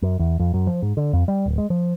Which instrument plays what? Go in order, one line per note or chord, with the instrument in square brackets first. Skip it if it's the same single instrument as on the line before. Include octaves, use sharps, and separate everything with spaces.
[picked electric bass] F#2
E2
F2
F#2
F3
G#2
D3
F2
G3
D1
G#3
F3